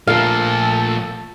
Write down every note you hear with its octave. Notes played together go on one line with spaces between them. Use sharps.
A#2 F3 A3 F4 A4 A#4 F5